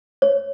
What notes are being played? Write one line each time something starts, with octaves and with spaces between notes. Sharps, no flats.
C#5